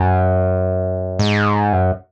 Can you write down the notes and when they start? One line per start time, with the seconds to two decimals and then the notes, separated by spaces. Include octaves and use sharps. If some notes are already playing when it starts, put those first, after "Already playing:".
Already playing: F#2
1.19 G#2
1.73 F#2